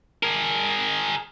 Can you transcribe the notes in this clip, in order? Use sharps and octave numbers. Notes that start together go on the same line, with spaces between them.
G#4 A#4